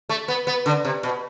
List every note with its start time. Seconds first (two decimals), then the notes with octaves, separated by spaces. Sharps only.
0.09 A3
0.28 B3
0.47 B3
0.66 D3
0.85 C3
1.03 B2